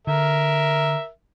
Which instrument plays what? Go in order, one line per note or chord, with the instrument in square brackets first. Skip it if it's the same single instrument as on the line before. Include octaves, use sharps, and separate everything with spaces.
[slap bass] D3 [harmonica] A#4 E5